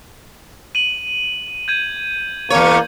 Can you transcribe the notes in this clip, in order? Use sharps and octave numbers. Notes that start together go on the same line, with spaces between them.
D#7 F#7
G6 G#6 D#7
E2 A#3 C#5